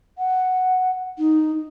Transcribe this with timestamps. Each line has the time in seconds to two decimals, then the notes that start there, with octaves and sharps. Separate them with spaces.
0.18 F#5
1.18 D#4